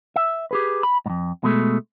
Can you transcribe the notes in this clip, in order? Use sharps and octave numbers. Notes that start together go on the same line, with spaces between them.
E5
G4 G#4 B4
B5
F2 G#2
B2 G#3 A3